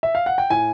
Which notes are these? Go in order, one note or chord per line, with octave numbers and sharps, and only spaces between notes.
E5
F5
F#5
G5
A2 G#5